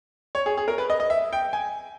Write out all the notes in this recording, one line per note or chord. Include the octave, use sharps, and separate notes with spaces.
C#5
G#4
G#4
A#4
B4
D#5
D#5
E5
G5
G#5